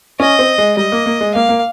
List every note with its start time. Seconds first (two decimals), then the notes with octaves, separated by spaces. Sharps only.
0.20 C#4 D#5
0.39 C4
0.58 G#3
0.77 G3 D#5
0.92 A#3
1.06 A#3
1.21 G#3
1.35 A#3 F5
1.49 A#3